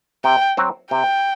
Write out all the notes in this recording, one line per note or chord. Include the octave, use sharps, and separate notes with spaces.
C3 G5
F#3 C4 F#4
C3 G5